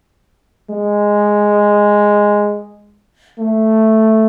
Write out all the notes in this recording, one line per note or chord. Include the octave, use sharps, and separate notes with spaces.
G#3
A3